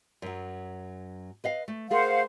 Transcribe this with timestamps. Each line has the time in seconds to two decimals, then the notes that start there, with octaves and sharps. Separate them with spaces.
0.22 F#2 F#3
1.44 B4 D#5 F5
1.68 A3
1.90 A3 G#4 A#4 C5 F5 F#5